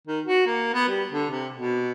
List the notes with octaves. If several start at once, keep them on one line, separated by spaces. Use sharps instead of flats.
D#3
F#4
A#3
B3
G3
D3
C3
B2